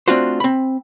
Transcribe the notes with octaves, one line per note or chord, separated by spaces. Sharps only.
A3 C4 D4 F4 F#4 C5
C4 B5